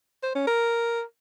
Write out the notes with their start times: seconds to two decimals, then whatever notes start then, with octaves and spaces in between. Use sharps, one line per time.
0.23 C5
0.35 C#4
0.47 A#4